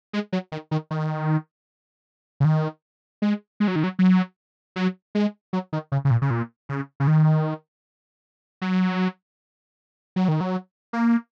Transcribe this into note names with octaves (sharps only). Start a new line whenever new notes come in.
G#3
F#3
D#3
D#3
D#3
C#3
D#3
G#3
G#3
F#3
D#3
F#3
F#3
F#3
G#3
F#3
D#3
C#3
C#3
A#2
C#3
A#2
C#3
C#3
D#3
F#3
F#3
D#3
F#3
A#3